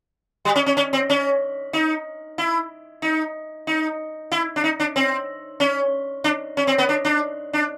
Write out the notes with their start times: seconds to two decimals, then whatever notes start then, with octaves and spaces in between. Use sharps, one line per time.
0.45 G3
0.56 C#4
0.66 C#4
0.77 C#4
0.93 C4
1.10 C#4
1.73 D#4
2.38 E4
3.02 D#4
3.67 D#4
4.32 E4
4.56 D4
4.64 D#4
4.80 D4
4.96 C4
5.60 C#4
6.24 D4
6.57 C#4
6.67 C4
6.78 B3
6.89 D4
7.05 D4
7.53 D4